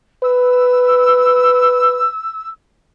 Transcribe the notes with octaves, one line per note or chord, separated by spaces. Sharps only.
B4 E6